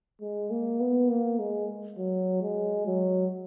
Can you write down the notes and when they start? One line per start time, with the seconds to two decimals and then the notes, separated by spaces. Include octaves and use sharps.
0.21 G#3
0.50 A#3
0.80 B3
1.09 A#3
1.39 G#3
1.98 F#3
2.42 G#3
2.86 F#3